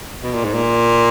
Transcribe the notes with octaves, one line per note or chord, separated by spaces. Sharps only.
B2
A#2
G#2
A#2